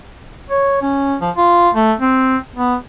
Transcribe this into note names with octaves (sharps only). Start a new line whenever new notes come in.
C#5
C#4
F3
F4
A3
C4
B3